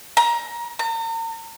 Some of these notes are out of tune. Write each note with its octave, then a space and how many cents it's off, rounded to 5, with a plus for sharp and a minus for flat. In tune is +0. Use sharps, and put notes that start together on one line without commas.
A#5 +20
A#5 -40